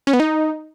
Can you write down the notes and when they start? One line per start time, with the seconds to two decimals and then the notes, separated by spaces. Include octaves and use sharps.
0.07 C#4
0.13 B3
0.20 D#4